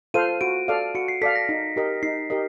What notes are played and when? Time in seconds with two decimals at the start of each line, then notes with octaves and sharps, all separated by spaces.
0.14 F4 A4 C5 F5 D#7
0.41 F#4 D7
0.68 A4 D5 F5
0.95 F#4 C#7
1.08 C7
1.22 A4 D5 F5 B6
1.36 A#6
1.49 D#4
1.76 G4 A#4 D#5
2.03 D#4 C7
2.30 G4 A#4 D#5